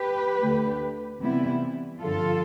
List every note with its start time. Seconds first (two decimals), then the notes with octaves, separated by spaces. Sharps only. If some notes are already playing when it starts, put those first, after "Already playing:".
Already playing: G4 B4
0.40 D2 D3 A3
1.20 C3 E3 G3 B3 E4
2.00 G2 D3 F3 F4 A4